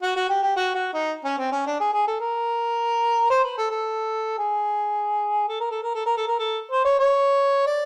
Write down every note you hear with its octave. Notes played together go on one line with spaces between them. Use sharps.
F#4
F#4
G4
G4
F#4
F#4
D#4
C#4
C4
C#4
D4
G#4
G#4
A4
A#4
C5
B4
A4
A4
G#4
A4
A#4
A4
A#4
A4
A#4
A4
A#4
A4
C5
C#5
C#5
D5